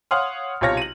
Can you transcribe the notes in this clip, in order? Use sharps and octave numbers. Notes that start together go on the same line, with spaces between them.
C#5 F5 F#5 C6 D#6 F6
B1 C3 F4 C#5 F6 A#6
D#7 F#7